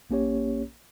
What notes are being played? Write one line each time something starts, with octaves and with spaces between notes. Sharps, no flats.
A#1 A#3 C#4 G4 C#5